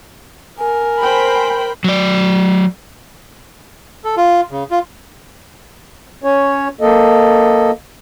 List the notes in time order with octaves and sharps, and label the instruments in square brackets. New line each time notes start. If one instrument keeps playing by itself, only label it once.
[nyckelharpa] A#4 [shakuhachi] G#5
[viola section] C5 G5 B5
[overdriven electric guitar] F#3 D5
[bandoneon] A4
F4
C#3
F4
[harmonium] C#4 C#5
A#3 A4 D#5